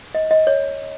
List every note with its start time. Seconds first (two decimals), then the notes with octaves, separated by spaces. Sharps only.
0.15 D#5
0.31 D#5
0.47 C#5